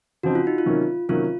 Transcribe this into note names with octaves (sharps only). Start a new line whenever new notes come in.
C#3 F3 C4 D#4 F#4
F4
D#4
F4
C3 D#3 F#3 A#3 C#4
C3 D#3 F#3 A#3 C#4 F4